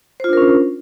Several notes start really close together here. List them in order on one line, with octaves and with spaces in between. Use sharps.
C5 F4 D4 A#4 C#4